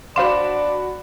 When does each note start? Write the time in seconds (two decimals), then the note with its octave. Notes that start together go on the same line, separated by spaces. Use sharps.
0.16 D4 F#4 C5 D5 F5 B5 C6 E7